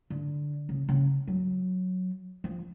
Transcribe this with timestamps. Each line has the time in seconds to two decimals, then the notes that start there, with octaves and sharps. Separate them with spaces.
0.10 D3
0.69 C#3
0.89 C#3
1.27 F#3
2.44 F3